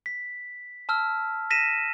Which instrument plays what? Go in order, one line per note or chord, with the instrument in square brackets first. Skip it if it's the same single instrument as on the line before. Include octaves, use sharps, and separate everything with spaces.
[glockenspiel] B6
A5 E6 F6
A#6 B6 D#7 E7